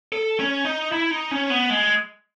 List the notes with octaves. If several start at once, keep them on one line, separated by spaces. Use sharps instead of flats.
A4
C#4
D#4
E4
D#4
C#4
B3
G#3